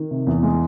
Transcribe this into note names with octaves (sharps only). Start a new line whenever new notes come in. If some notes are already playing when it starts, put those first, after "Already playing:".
Already playing: D#3
C3
E2
G#3